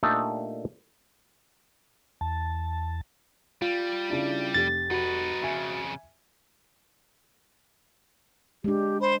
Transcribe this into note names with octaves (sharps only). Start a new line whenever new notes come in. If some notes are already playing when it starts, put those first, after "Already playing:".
A#2 A3 D4 D#4 G4 A4
E2 A5
G3 F4
C#3 D4 E4
F1 G4 A6
D#4 F#4 B4
F2 C#3 E5 G#5
G#3 D4 G4
C5 B5